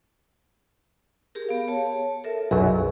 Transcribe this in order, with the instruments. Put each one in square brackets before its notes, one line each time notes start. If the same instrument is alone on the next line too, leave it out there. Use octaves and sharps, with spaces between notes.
[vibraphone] G4 G#4 A#4
B3 F5
C#5 A5
A4 A#4 E5
[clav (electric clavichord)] B1 F#2 F#3 [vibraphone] G#4